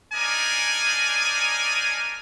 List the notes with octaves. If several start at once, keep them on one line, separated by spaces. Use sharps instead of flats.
D4 D#4 G#4 A#4 D5 G#5